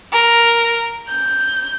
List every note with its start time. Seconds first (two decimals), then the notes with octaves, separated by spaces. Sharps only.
0.12 A#4
1.08 G6